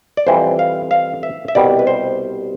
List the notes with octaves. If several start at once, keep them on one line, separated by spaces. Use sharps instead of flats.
D5
F2 E3 G3 C5
F5
F5
E5
E5
C2 B2 G3 D5
B4
C5